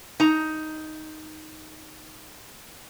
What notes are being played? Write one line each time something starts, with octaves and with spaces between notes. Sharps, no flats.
D#4 A#5